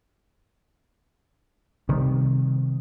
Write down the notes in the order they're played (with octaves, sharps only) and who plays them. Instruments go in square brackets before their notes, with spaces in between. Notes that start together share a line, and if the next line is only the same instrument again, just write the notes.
[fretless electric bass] C3 D#3 G3